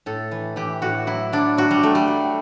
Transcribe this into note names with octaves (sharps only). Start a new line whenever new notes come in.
A2 A4
E3
E3 G4
A2 F#4
F#3 E4
F#3 D4
F#3 F#4
G3
F#3 A3
G3
F#3